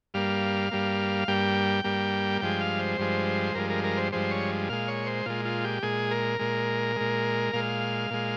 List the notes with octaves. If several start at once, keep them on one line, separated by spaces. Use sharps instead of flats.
G2 G3 A#3 F5
G2 G3 A#3
G2 G3 A#3 G5
G2 G3 A#3
G2 F3 G#3 G5
F5
C5
G2 F3 G#3
G2 F3 G#3 A#4
A#4
A#4
C5
G2 F3 G#3 C5
C#5
A#2 G#3 F5
C#5
C5
A#2 G#3 F4
F4
G4
A#2 G#3 G#4
A#4
A#2 G#3
A#2 G#3
A#2 G#3 F5
A#2 G#3